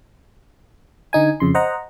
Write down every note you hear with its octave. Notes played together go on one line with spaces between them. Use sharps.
D3 D#4 G#5
F2 C#3 C6
C5 D#5 F#5 A#5